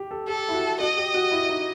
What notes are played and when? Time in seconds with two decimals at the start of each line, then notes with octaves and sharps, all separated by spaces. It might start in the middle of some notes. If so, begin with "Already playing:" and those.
Already playing: G4
0.11 A4
0.28 G4 A4
0.49 E4
0.54 F#4
0.80 F#4 D#5
0.97 G4
1.14 F#4
1.32 E4
1.49 D#4